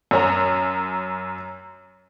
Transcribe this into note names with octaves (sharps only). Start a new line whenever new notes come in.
F#2 C#4 A#5